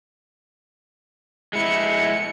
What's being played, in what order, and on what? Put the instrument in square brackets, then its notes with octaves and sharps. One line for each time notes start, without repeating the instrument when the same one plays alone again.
[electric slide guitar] G#3 E4 [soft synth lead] C#7